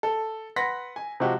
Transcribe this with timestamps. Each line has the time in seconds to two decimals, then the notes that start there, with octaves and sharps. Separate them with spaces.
0.03 A4
0.56 B4 F#5 C6 A#6 B6
0.96 G#5
1.20 C3 F3 G#3 F#4 G4